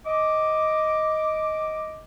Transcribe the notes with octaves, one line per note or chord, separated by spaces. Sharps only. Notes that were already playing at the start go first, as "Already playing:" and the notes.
D#5 D6